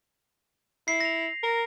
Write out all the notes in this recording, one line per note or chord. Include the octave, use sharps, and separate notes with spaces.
E4 C7
A#6 F7
A#4